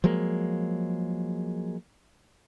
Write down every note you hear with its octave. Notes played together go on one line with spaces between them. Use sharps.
F3 F#3 G#3 A#3